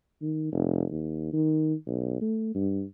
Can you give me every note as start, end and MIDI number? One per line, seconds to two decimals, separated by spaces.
0.22 0.48 51
0.52 0.84 29
0.91 1.32 39
1.33 1.74 51
1.86 2.17 35
2.21 2.51 57
2.55 2.83 43